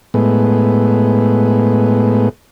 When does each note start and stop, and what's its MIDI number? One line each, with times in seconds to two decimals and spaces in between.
0.14 2.29 45
0.14 2.29 56
0.14 2.29 59